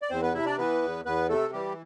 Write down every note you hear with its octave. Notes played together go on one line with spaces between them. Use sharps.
D5
E2 C4 C5
B3 B4
C3 E4 E5
D4 D5
E3 B3 B4
E2
E2 B3 B4
C3 A3 A4
E3 G3 G4